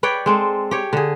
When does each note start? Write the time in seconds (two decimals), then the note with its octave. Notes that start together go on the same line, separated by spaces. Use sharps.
0.03 B4 C#5 D5 G5
0.26 G#3 C4 A4
0.71 G4 C#5
0.93 D3 G#4